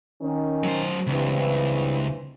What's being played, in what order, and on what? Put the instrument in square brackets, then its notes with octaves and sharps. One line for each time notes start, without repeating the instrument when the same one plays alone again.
[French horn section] D#3 C#4
[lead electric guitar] F#3 C5
[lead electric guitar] C#2 [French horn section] G2 E3 C4